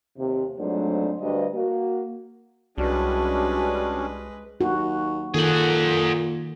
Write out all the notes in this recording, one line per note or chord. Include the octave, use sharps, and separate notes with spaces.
D#2 C3
F2 G#2 F#3 A3 D4 C5
D2 G2 D#5
A#3 F#4
C2 G3 G#3 C#4 D4 F#4 B4
D#2 F#4
A#2 D#3 G#4 A4 F#5